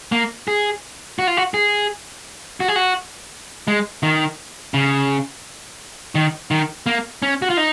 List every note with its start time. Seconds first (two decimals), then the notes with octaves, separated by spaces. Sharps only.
0.12 A#3
0.48 G#4
1.19 F#4
1.27 F4
1.37 F#4
1.54 G#4
2.60 F#4
2.68 G#4
2.76 F#4
3.68 G#3
4.03 D#3
4.74 C#3
6.15 D#3
6.51 D#3
6.86 A#3
7.22 C#4
7.42 F#4
7.50 F4
7.57 D#4